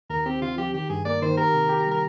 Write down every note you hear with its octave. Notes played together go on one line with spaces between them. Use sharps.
D#2 A#4
C4 G4
D3 F4
F3 G4
D#3 G4
G2 G#4
A#3 D5
D#3 C5
G4 A#4
C3
G4
G3
A#4